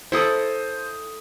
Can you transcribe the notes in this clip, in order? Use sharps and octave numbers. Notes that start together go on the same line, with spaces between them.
E4 A4 C5 A#5 D#6